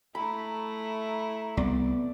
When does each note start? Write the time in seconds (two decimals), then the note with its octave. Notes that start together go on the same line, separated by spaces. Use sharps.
0.15 A3 E4 A#5 B5
1.57 C2 B3 D5